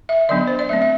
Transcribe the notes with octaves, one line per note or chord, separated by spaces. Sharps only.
E5
D3 F#3 B3 D4 D5
C5
D5
F#3 A3 C4 E5
E5